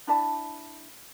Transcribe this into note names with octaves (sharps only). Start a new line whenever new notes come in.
D4 E4 D5 A5